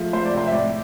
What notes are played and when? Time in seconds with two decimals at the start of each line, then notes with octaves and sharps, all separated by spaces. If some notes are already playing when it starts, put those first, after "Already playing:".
Already playing: F3 G#3 A3
0.13 A3 C5
0.25 D5
0.33 C3 C5
0.48 E5
0.52 A2 D5